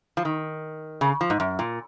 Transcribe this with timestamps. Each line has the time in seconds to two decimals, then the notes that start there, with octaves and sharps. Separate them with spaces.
0.17 F3
0.25 D#3
1.01 C#3
1.21 F3
1.30 G#2
1.40 F#2
1.59 A#2